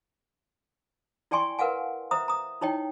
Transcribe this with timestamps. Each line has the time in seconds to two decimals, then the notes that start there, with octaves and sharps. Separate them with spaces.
1.31 E4 D5 G5 G#5 C6 C#6
1.59 A#4 B4 F5 F#5 G#5
2.11 C5 E5 A#5 D#6
2.28 A#5 D#6
2.61 D#4 E4 C#5 D#5 G5